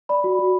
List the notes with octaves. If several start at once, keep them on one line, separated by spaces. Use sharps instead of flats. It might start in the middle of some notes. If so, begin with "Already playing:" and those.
D5 B5
F#4
F#4